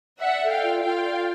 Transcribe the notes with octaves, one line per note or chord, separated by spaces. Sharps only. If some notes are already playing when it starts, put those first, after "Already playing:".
D5 E5 F#5
A4
F5 G5
F4
F4 F5 G5
D5